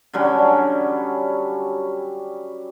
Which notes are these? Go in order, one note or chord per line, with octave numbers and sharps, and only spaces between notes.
D3 F#3 G3 C#4